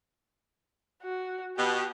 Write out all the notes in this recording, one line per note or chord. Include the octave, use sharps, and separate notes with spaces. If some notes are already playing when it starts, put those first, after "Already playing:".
F#4
B2 G4